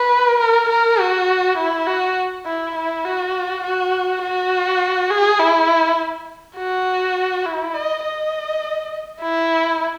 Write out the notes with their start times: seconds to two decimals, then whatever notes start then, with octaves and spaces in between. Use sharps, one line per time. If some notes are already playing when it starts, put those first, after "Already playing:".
Already playing: B4
0.40 A#4
0.69 A#4
1.00 F#4
1.57 E4
1.87 F#4
2.46 E4
2.75 E4
3.05 F#4
3.64 F#4
4.22 F#4
5.10 G#4
5.40 E4
6.57 F#4
7.46 E4
7.74 D#5
8.04 D#5
9.21 E4